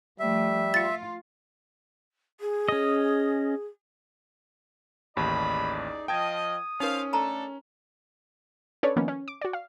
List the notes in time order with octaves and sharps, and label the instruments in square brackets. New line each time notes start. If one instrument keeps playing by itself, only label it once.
[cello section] F3 A3 [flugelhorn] G3 [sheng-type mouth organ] E5
[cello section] F4 [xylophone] A6 C#7
[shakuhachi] G#4
[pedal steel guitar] C#4 D#5
[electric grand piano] A1 D#2 [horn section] D#4 G#4 D5 [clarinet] B5
[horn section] F3 F4 D#5 [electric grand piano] G5 A5 G#6 [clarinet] D#6
[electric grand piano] C#4 [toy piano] D#4 A#4 [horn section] C5 F5
[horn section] A3 D4 A4 [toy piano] A5 A#5
[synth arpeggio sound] C#4 D4 A4 B4 C#5 D5
D#3 F3 A#3 B3 C#4
C#4
D6
F#4 D5
F5